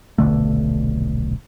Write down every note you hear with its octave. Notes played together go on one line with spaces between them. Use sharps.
D#1 B1 D3 A3